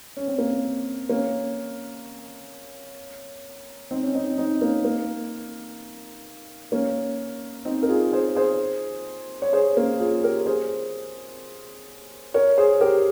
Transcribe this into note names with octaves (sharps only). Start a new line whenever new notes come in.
C#4
C4
A#3
C4
A#3 C#4
C4 D#4
C#4
C4 D#4
C4 D#4
A#3 C#4
A#3
A#3 C#4
C4 D#4
A#4
F4 G#4
G#4 C5
G#4 C5
C#5
G#4 C5
A#3 C#4
F4 G#4
G4 A#4
G#4 C5
A#4 C#5
G#4 C5
G4 A#4